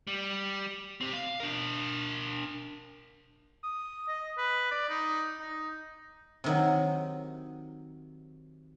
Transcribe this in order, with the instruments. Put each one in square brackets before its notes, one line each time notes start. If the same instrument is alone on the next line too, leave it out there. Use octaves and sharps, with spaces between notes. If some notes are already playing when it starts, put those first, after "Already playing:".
[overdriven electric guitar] G3
C4 G4
F5
D4 A#4
[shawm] D#6
D#5
B4
D5
D#4
D#4
[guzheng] C3 D#3 F#3